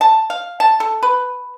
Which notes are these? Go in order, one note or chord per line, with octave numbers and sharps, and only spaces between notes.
A5
F5
A5
A4
B4